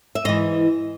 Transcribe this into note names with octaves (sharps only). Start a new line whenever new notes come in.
E5
G#2 E3 D#5